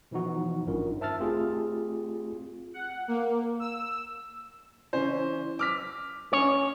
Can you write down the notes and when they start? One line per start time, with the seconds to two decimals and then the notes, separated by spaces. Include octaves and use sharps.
0.11 B2 E3 F3 D#4 F#4
0.67 G#1 G2 C#4 D#4 F4 A#4
1.01 C5 E5 A5 E6 F6 A6
1.20 A3 C4 F4 G4 G#4
2.74 F#5
3.08 A#3
3.60 E6
4.93 E3 C#4 C5
5.59 D6 F6 B6
6.33 C#4 C#5